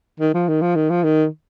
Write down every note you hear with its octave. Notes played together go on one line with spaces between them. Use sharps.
D#3
F3
D#3
F3
D#3
F3
D#3